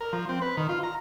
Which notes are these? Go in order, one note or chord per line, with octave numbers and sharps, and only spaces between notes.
A#4
F3
C4
B4
D#3
F4
A#5